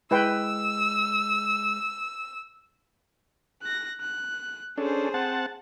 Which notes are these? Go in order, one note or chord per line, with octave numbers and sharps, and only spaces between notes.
G#3 E4 B4 G5 E6
F#6 A#6
F#6
C#4 D4 G#4 A4 C5
C4 F#5 A5